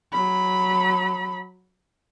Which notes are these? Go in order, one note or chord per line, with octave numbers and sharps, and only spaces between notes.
F#3 B5